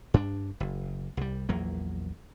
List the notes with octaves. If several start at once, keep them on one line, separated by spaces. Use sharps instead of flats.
G2 D4
F#1
C2 G3
A#1 E2 F#3 A#3